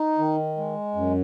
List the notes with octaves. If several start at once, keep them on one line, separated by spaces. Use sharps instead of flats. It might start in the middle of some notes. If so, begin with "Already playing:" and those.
Already playing: D#4
D#3
G#3
F#2